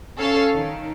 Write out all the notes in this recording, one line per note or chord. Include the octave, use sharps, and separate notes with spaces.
C#4 A4 F5
D#3